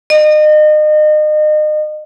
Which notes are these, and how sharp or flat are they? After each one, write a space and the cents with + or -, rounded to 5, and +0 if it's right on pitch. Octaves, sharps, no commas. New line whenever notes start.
D#5 -35